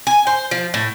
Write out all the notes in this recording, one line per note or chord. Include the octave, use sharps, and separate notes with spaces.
G#5
C5
F3
A2